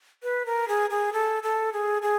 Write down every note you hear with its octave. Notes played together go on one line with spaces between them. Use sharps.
B4
A#4
G#4
G#4
A4
A4
G#4
G#4